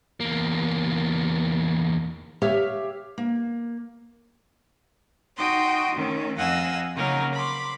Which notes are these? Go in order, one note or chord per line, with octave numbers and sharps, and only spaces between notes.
E2 A#3
G4 C#5 E5 F5
A#3
D#4 F#4 G5 C6 D#6
D#3 A3 C#4
F2 D#5 F5 F#5 G#5 E6
C#3 F#3 A#3 C#4 D#4 A#4
B5 C6 D6